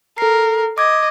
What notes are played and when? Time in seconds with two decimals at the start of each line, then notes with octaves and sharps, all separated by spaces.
0.18 A4 A#4 C7
0.78 D#5 D6 G#6